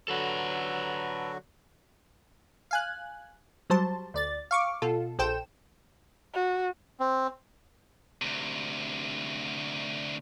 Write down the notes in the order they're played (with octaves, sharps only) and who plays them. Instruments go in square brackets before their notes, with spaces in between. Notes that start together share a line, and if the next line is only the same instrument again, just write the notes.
[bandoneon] D3 F#3 F#4 [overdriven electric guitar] A4 B4
[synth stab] F5 G#5 F#6
F#3 G3 C5 A5
D2 D5 A6
F5 C#6 D6
B2 F4 A4
A#1 A4 C5 G5 E7
[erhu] F#4
[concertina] C4
[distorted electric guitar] D2 C3